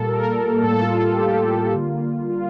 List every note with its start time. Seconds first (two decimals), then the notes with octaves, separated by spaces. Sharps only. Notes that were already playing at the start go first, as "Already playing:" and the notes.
Already playing: A#2 G3 A#3 A4
0.08 A#4
0.63 A2 G3 A#3 A4
0.81 F4
0.99 F4
1.13 G4
1.28 F4
1.74 D3 G3 A#3
2.30 F4